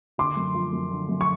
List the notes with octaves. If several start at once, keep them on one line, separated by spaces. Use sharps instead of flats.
D3 C6 D6
F#2
F3
F#2
D3
F#2
C#6